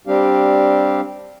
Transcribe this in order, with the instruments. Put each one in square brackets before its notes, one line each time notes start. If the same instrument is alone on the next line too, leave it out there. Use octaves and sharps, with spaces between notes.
[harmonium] G3 C4 D4 G4 F5